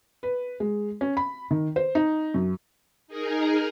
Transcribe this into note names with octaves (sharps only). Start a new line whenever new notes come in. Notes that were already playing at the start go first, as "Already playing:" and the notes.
B4
G#3
C#4
B5
D#3
C5
D#4
F#2
D#4 G#4 A#4